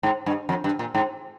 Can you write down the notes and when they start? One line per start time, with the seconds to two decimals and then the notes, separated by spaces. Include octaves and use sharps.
0.03 G#2
0.26 G2
0.49 F2
0.64 G2
0.79 A#2
0.95 G#2